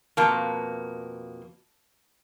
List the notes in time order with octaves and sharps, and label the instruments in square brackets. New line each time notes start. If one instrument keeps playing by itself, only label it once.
[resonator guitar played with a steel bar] F2 B2 A#3 [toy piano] A5 A#5 C#6